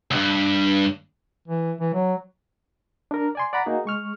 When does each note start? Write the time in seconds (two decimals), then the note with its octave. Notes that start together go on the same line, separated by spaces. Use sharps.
0.11 D2 G2
1.48 E3
1.80 E3
1.94 F#3
3.11 D4 A#4
3.35 D5 G#5 C6
3.53 D5 F#5 A#5 B5
3.66 A#3 D#4 F#4 G#4
3.86 G#3 C#6 F6